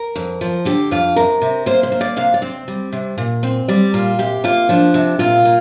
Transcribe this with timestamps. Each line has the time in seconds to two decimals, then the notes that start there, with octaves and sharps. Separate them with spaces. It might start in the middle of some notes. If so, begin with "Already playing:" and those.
Already playing: A#4
0.16 F2
0.41 F3
0.65 D3 G4
0.91 F2 F4
1.16 C3 A#4
1.42 C3
1.66 A#3 C5
1.83 C5
1.92 A#3
2.01 D5
2.17 C3 F5
2.34 D5
2.42 C4
2.68 G3
2.92 C3
3.18 A#2
3.43 C4
3.68 G3 D5
3.94 A#2 F4
4.19 C3 G4
4.44 A#3 F4
4.69 F3 D4
4.94 C3
5.19 A#2 F4
5.45 A#3